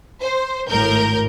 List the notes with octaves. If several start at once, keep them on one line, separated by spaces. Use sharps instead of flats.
C5
G#1 A2 A#4 G6